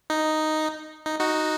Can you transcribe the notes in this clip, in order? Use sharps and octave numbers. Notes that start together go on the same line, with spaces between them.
D#4
D#4
D#4 F#4